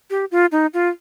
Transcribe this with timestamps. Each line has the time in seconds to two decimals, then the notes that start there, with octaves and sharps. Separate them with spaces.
0.10 G4
0.31 F4
0.52 D#4
0.74 F4